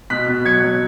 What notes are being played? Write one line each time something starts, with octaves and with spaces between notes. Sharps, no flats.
B2 F#6 B6
B2
F#3 G#6 C#7
F#3